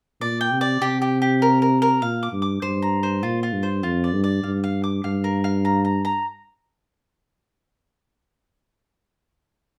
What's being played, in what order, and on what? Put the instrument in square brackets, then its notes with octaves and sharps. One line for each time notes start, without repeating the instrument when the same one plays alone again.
[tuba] A#2 [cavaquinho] D5
[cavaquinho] G5
[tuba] C3
[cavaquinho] D5
[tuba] C3 [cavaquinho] G4
[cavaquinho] G4
G4
A#4
A#4
A#4
[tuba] A#2 [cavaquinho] F5
[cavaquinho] D6
[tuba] G2
[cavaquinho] D6
[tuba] G2 [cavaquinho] C5
[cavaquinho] A#5
C5
[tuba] A#2 [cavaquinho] F4
[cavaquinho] F4
[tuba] G2
[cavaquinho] C5
[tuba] F2 [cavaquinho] F4
[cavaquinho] D5
[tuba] G2
[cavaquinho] D5
[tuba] G2 [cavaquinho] F5
[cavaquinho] F5
D6
[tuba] G2 [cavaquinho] F5
[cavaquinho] A#4
F5
A#5
A#5
A#5